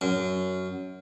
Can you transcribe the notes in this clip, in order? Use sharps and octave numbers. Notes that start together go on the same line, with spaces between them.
F#2